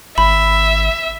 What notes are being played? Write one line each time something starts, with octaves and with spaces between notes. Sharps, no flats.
G#1 E5 B5